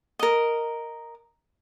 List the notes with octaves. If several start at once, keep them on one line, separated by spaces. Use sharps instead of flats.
A#4 D#5